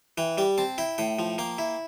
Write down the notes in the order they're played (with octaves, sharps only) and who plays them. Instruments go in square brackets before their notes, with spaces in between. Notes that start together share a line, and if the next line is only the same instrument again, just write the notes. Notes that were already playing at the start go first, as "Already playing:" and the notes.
[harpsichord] E3 G5
G3 G5
C4 A5
E4 G5
A2 G5
F3
A#3 G5
E4